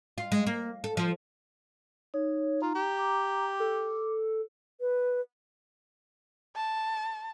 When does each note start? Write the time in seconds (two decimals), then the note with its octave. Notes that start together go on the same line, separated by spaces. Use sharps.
0.18 F4
0.32 G#3
0.46 A#3
0.84 A4
0.97 F3
2.14 D#4 C#5
2.62 F4 A#5
2.75 G4
2.97 D6
3.60 A4
4.81 B4
6.56 A5